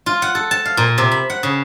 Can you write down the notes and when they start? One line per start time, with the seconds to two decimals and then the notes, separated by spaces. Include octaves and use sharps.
0.06 F4
0.22 F#5
0.35 A4
0.51 A5
0.65 F5
0.77 A#2
0.98 C3
1.12 B5
1.30 F#5
1.43 C#3